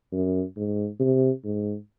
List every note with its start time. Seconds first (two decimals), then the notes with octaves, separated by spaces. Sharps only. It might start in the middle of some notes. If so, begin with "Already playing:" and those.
0.12 F#2
0.57 G#2
1.00 C3
1.44 G#2